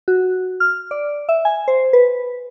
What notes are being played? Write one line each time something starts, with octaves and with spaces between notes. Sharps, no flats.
F#4
F6
D5
E5
G#5
C5
B4